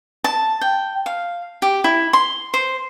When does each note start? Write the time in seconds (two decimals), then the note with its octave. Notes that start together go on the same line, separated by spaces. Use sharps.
0.24 A5
0.61 G5
1.06 F5
1.62 G4
1.84 E4
2.13 C6
2.54 C5